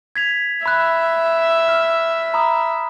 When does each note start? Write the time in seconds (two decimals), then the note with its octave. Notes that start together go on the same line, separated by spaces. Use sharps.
0.16 G#6 B6 F7
0.66 E5 B5 F#6
1.68 F6
2.34 A#5 B5 D#6